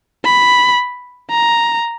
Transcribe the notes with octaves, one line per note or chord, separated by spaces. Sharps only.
B5
A#5